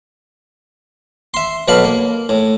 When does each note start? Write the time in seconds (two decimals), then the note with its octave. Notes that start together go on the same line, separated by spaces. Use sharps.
1.34 E5 C6
1.68 B2 F#3 A4 D5 F5 B5
1.84 A#3
2.29 A2